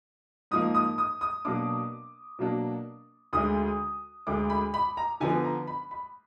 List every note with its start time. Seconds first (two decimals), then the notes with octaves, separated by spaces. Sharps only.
0.51 G#2 F3 A#3 D#6
0.75 D#6
0.98 D#6
1.21 D#6
1.45 B2 F#3 A#3 D4 D6
2.39 B2 F#3 A#3 D4
3.33 D2 D3 G#3 D#6
4.27 D2 D3 G#3 D6
4.50 B5
4.74 B5
4.97 A#5
5.20 D3 F3 B3 G#5
5.44 A#5
5.67 B5
5.91 B5